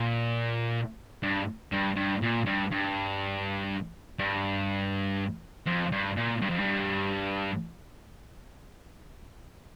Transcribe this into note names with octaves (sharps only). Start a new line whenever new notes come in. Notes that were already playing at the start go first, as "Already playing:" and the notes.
Already playing: A#2
G2
G2
G2
A#2
G2
G2
G2
F2
G2
A#2
G2
F2
G2